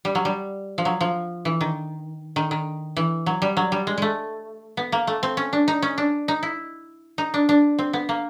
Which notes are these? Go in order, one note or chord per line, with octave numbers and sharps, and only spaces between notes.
G3
F#3
G3
F3
F#3
F3
E3
D#3
D#3
D#3
E3
F#3
G3
F#3
G3
G#3
G#3 A3
B3
A#3
A3
C4
C#4
D4
D#4
C#4
D4
D#4
E4
D#4
D4
D4
C4
B3
A#3